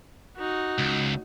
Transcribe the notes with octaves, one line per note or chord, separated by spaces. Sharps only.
D#4 F#4
C#2